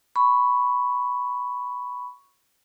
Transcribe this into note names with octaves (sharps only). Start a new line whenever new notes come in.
B5 C#6